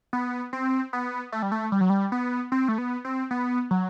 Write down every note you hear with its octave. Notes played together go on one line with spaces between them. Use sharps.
B3
C4
B3
A3
G3
A3
G3
F#3
G3
B3
C4
A3
B3
C4
B3
F#3